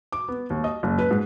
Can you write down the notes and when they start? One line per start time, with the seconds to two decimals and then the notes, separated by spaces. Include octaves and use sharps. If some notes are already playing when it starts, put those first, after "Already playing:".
0.12 D6
0.28 B3
0.50 D#2
0.64 D#5
0.83 F#1
0.99 B4
1.10 G#2